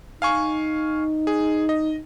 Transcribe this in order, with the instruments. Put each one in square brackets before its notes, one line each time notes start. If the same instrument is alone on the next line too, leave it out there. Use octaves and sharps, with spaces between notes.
[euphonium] D#4 [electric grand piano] F5 G#5 C#6
[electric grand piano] G#4
D#5